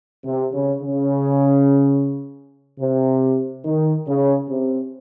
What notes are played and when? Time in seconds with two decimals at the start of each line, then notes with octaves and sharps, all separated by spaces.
0.24 C3
0.53 C#3
0.81 C#3
2.79 C3
3.64 D#3
4.06 C#3
4.49 C3